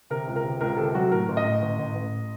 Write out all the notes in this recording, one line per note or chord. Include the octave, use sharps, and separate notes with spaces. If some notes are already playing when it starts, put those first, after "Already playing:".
C3 A#4
C#2
A#4
C3
C#2 A#4
C3 A4
F#3 F#4
A2 A#4
A1
D#5
A2
A1
A1
A1